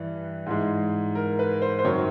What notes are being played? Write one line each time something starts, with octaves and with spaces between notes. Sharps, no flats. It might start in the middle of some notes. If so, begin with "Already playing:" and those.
Already playing: G2 E3
G#2 E3 G#3
A#4
B4
C5
C5
F#2 D#3 F#3 C#5